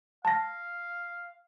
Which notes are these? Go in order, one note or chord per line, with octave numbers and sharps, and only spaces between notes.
F5 A5 A#6